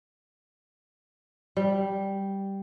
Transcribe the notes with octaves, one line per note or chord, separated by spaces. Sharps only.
G3